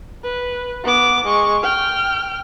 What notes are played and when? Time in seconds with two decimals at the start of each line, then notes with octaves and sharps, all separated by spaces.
0.24 B4
0.84 B3 D6
1.25 G#3 C#6
1.63 G5 F6